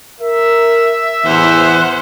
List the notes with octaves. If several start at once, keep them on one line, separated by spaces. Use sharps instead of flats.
A#4 E5
A1 E2 A2 C5 F#5